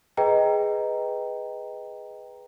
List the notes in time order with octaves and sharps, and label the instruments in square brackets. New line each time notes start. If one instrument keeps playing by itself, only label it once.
[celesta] G#4 B4 D#5 G5 A#5